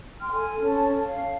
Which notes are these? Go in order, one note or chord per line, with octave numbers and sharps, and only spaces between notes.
G5 C6 F6
A4 G#5
C#4 A4 A5
F5